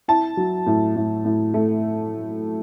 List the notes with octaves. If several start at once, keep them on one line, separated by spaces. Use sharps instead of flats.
E4 A5
F#3
A2
A2
A2
A3